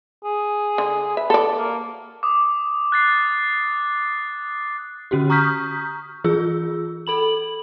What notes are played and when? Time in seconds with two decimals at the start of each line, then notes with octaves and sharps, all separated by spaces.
0.24 G#4
0.78 D3
1.17 B4 E5
1.30 A4 D5
1.57 A#3
2.23 D6 D#6
2.92 F#6 A6 C7
5.11 D3 C#4 F#4 G4
5.30 A#5 C#6 D#6 F6 G6 B6
6.24 E3 F4 G#4 E6
7.07 A4 B5 F#7